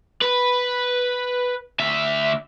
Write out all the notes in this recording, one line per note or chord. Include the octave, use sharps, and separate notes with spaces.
B4
D2 E5